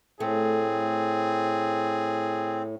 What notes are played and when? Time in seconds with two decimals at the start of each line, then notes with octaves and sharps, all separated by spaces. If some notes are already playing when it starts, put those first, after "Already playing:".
0.20 A2 A3 C4 G#4